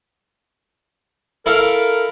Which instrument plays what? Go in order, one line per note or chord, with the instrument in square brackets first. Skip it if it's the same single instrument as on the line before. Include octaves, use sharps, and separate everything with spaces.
[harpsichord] E4 A4 F5 [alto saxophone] A#4